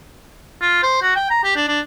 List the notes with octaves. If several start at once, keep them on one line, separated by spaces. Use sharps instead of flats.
F4
C5
F#4
G5
A#5
G4
D4
D4